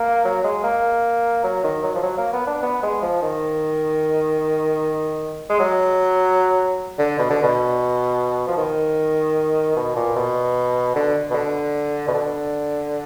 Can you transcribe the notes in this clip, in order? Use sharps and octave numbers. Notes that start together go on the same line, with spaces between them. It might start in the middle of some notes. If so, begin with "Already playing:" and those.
Already playing: A#3
F#3
G#3
A#3
F#3
D#3
F#3
F3
F#3
A#3
B3
D4
B3
G#3
F3
D#3
G#3
F#3
D3
B2
D3
B2
F3
D#3
B2
A#2
B2
D3
B2
D3
B2
D3